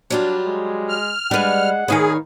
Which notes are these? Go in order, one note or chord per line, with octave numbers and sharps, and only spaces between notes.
F#3 G3 D4 F4
G#3
F6
G3 G#3 D4 B4 F#5
D#3 D#4 G#4 B4 C#5 F5